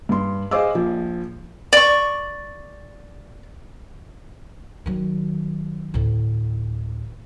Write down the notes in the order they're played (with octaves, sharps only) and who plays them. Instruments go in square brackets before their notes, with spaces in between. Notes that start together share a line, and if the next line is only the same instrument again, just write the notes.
[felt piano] G2 C6
G#4 C5 D#5 F5 D6 E6
A#1 F3
[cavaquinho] D5 C#6
[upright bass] D#3 F#3
D2 A2